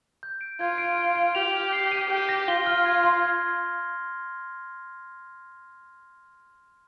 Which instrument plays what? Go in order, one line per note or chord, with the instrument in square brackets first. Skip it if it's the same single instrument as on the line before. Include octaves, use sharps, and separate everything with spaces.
[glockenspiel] G6
D7
[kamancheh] F4 [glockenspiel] G#6
[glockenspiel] D7
G#6
D7
[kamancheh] G4 [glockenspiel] F7
[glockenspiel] F6
C7
D#7
[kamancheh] G4 [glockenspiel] G6
[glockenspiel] A#6
[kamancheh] F4 [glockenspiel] G7
[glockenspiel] F6
G#6
C6
G#6